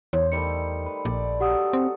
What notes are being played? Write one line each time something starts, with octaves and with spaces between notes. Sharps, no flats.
E2 C5 C#5
D#3 G3 A3 C#7
B4
A#1 D5
F#3 G4 A4 F#5 D#6
C4